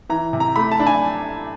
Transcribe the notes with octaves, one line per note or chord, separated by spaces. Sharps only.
E3 A#5
C3
A#5
A3 B5
A5
D4
G#5